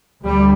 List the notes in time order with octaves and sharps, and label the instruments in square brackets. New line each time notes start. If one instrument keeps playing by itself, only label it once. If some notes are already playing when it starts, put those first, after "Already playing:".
[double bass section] D2 G3